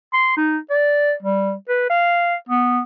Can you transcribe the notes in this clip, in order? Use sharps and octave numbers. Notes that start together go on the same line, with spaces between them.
C6
D#4
D5
G3
B4
F5
B3